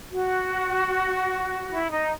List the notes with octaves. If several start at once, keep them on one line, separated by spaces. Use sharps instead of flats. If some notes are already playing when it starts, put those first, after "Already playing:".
F#4
E4
D#4